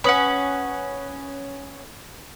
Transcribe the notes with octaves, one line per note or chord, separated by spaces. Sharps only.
C#4 B4 F#5 B5 D#6 F#7